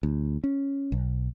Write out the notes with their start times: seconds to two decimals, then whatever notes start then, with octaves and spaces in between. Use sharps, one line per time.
0.03 D2
0.44 C#4
0.92 B1